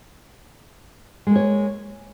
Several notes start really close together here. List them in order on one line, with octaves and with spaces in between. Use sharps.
G#3 A#3 C#5